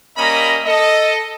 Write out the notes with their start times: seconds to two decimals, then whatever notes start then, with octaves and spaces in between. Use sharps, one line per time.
0.17 G3 A#3 C#4 D#5 A#5 B5
0.66 A4 D#5